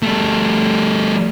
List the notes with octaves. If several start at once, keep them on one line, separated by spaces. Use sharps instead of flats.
G3 A3